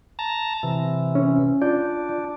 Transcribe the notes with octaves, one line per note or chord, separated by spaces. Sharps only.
A5 A#5
C3 E3
C#4
D4 F4 D5 G6